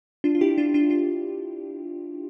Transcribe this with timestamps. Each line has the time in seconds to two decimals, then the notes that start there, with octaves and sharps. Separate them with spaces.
0.24 D4 F4
0.35 F4
0.41 E4 G4
0.58 D4 F4
0.74 D4 F4
0.90 D4 F4